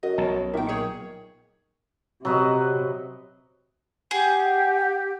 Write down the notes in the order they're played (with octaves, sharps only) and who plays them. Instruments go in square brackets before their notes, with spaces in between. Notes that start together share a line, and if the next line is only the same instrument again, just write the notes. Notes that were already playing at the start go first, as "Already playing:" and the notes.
[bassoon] F#2 [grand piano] F#4 [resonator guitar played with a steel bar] D#5
[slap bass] B1 [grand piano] C#5 A5
[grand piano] A#2 [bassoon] D#3 [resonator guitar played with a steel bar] E5 G5
[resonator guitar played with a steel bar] G#4 C#5
[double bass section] C3 [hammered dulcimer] F#3 B4 D#5
[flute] G4 [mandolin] G#4 [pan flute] F#5